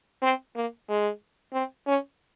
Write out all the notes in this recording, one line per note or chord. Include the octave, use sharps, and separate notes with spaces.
C4
A#3
G#3
C4
C#4